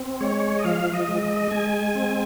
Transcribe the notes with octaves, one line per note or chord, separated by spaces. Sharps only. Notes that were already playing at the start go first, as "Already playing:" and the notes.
Already playing: C4
G#3 C#5
D#5
F3 F5
D#5
G#3
D#5
G#3 G#5
C4